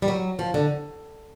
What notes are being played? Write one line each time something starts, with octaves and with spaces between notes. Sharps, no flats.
G3
F#3
F3
D3